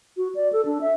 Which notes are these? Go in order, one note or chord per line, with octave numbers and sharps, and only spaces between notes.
F#4
D5
A4
D4
E5